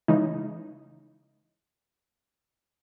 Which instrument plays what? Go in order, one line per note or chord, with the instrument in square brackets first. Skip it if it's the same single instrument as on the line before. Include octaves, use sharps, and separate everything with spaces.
[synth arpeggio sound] C#3 E3 G#3 D#4